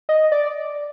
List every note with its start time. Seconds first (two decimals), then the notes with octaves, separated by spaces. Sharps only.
0.09 D#5
0.32 D5